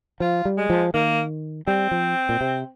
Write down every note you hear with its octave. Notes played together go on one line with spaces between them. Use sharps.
F3 F4
G3
G#3
F3
D#3 A#3
G3 C4
F3
A#2
C3